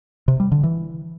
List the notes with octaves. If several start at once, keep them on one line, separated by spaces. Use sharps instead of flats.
C3
G3
D3
E3